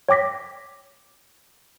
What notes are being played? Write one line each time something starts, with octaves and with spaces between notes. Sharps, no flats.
C#5 G5 D6 A#6 B6